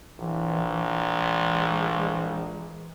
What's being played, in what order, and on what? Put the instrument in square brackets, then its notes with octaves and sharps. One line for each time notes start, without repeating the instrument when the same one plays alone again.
[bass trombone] A#1 [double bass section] E3
[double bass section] E3 G#3